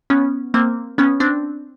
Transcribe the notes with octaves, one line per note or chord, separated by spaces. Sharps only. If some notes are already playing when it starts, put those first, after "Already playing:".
B3 C#4
A#3 C4
B3 C#4
C4 D4